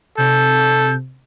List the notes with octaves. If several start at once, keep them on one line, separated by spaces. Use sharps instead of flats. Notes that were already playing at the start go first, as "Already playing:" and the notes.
C3 A4 G6